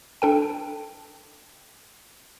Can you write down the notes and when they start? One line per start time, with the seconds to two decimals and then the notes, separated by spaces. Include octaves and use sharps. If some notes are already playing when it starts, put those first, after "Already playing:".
0.22 D4 A4 G5